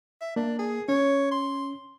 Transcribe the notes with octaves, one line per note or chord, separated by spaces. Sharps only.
E5
A#3 D4
G#4
C#4 C#5
C6